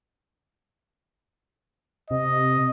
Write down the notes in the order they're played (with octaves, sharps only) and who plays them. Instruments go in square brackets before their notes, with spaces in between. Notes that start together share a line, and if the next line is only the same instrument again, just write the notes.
[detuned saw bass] C3 [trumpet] D#5